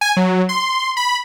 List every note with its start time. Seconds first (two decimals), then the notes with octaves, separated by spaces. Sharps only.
0.01 G#5
0.17 F#3
0.49 C6
0.97 B5